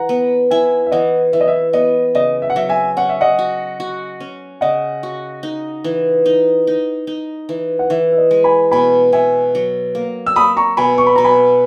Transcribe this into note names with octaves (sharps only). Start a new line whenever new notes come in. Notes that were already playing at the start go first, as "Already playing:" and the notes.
Already playing: E3 F#5 A#5
B3
E4 E5 G#5
E5
E3 D#5 F#5
E3 E5
D#5
E5
B3 D#5
C#3 D#5
E5
F#5
F#3 E5
E5 G#5
C#4 F#5
E5
D#5 F#5
F#4
F#4
C#4
C#3 D#5 F#5
F#4
D#4
E3
D#4
D#4
D#4
E3
F#5
E3 E5
E5
D#5
G#3
G#5 B5
B2 G#5 B5
B2 E5 G#5
F#3
A#3
E6
A#3 B5 D#6
A#5 C#6
B2 G#5 B5
C#6
B5
B2 A#5
G#5 B5